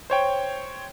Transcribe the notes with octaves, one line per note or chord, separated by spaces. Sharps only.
C5 C#5 G5